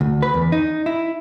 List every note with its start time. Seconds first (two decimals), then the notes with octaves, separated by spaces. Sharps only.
0.01 D2
0.22 B4
0.34 E2
0.52 D#4
0.86 E4